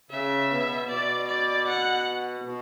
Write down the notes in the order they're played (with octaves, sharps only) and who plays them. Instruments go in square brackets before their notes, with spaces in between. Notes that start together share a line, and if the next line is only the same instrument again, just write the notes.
[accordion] C#3 [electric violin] E5
[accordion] B2
[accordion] B2 [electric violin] D5
[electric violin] D5
F#5
[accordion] B2